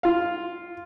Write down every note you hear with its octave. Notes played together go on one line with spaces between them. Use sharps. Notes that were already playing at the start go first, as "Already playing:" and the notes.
F4 F5